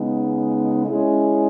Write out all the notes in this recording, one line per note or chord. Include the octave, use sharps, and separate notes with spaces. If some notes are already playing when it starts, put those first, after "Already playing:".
Already playing: C#3 G#3 B3 D#4
G#3 C#4 E4 G#4